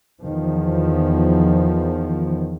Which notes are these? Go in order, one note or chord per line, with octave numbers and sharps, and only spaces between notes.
E2 D#3 F3